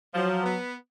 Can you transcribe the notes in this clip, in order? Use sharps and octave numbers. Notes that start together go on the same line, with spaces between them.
F3 F#3
B3